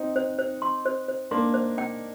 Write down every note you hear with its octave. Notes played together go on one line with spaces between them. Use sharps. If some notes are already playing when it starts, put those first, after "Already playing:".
Already playing: C4 D#4
C5
C5
C6
C5
C5
A#3 D4 C6
C5
G5